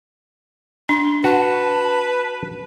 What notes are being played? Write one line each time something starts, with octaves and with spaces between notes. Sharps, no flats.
D4 C6
F#4 B4 A5